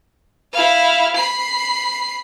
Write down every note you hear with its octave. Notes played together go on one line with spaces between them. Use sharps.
E4 F5
B5 C7